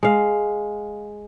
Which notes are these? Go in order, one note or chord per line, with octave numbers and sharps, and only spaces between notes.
G#3 F5